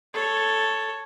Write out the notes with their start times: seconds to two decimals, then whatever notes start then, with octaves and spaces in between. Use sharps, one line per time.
0.14 A4 C#5